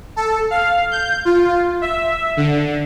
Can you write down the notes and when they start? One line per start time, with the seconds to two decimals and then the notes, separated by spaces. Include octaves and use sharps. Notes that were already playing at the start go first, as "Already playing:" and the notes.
0.16 A4
0.51 F5
0.91 G6
1.25 F4
1.82 E5
2.37 D3